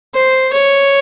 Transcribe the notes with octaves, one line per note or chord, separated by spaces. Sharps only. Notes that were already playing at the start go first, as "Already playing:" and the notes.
C5
C#5